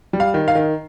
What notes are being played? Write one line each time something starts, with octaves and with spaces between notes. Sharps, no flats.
G3
F5
D#3
F5
D#3